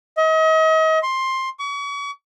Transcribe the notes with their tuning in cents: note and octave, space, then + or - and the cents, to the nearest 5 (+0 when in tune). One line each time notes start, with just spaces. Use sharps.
D#5 +35
C6 +15
C#6 +40